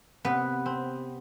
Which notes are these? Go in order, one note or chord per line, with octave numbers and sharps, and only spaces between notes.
C3 B3 B4
C4